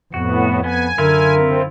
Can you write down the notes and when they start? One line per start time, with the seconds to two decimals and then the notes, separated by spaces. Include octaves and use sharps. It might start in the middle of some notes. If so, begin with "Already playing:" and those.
0.14 F2 A2 B3 F#4
0.64 B3 G#5
0.98 F#2 D3 E4 F4 A#4
1.37 C4